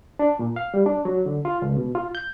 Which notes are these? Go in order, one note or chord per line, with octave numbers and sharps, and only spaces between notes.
D4
A#2
F5
G3
D4
F#3
D3
F4
C#2
B2
F4
G6